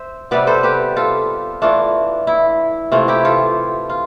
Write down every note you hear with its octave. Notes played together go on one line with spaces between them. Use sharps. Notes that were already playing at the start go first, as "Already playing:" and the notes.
Already playing: C5 E5
C3 G3 B3 B4 D5
A4 C5
G4 B4
F4 A4
E3 A3 D4 F4
E4
C3 E3 A3 F4
E4 G4
F4 A4
F4